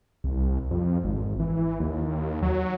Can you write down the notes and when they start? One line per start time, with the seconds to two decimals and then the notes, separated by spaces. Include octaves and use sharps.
0.24 C2
0.71 F2
1.04 G#1
1.40 E3
1.80 D#2
2.43 F#3